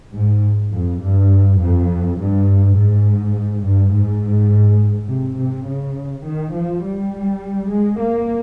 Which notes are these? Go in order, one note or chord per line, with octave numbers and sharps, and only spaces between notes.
G#2
F2
G2
F2
G2
G#2
G2
G#2
C3
C3
C#3
D#3
F3
G3
G#3
A#3